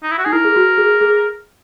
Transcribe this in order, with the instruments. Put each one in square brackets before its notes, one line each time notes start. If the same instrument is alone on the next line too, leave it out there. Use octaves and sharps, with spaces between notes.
[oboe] D#4
E4
F#4
[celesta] D#4 [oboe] G#4
[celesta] E4 [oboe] A#4
[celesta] G#4
F#4
G#4
G#4